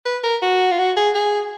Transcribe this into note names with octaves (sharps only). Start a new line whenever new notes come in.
B4
A#4
F#4
F4
F#4
G#4
G#4